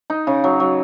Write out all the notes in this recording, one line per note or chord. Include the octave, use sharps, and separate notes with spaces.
D#4
C#3
F#3
F#3